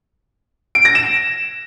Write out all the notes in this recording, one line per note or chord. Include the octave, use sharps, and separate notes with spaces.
D7
A#6
E7